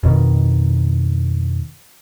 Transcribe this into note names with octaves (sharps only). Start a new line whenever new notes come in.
F2 B2 D#3